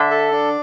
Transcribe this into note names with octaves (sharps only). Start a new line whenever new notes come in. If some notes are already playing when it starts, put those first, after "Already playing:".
Already playing: D3 E5
A4
D4